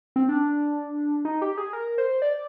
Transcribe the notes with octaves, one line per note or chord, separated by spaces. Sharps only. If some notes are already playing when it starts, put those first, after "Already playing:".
C4
D4
D#4
G4
G#4
A#4
C5
D5